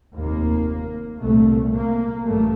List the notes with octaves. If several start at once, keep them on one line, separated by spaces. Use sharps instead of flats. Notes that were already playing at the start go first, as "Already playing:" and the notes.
F1 D#2 A#3
C2 A#2 A3
A#3
A1 G2 A3